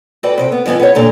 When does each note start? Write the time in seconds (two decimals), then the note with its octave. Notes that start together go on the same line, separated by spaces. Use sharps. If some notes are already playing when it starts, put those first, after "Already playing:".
0.23 F#4 A4 B4 D5 G5
0.38 C3 D#5 G5
0.52 B3
0.66 F2 C#3 B3 E4 G5
0.80 B3 C#5
0.95 A#2 D3 G4 A#5